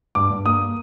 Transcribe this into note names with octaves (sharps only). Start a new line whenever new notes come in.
G2 D6
G2
A#3 D#6